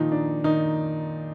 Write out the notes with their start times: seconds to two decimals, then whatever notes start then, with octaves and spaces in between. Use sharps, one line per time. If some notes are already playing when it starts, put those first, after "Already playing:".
Already playing: A#2 D#3 F3 D#4
0.12 D4
0.44 D#3 D#4